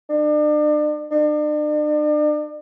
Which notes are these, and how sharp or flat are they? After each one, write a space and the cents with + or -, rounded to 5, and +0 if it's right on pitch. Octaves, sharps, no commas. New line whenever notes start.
D4 +40
D4 +40